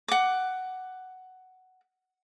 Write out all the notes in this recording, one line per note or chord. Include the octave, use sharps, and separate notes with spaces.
F#5 D6